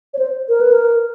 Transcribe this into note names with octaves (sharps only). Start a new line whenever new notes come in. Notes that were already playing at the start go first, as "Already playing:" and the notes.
C#5
C5
A#4
B4
A#4